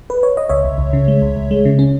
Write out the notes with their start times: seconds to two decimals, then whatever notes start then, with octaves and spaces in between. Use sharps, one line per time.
0.10 B4
0.23 C#5
0.37 D#5
0.49 C#2 C#5 E5
0.65 C#2
0.78 C#2
0.93 C#3
1.08 G#3
1.22 C#2
1.36 C#2
1.51 G#3
1.65 C#3
1.79 C#4